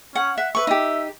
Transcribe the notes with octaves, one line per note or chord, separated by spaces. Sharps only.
C#4 F#5
E5 F#5
B4 E5 C#6
D#4 G4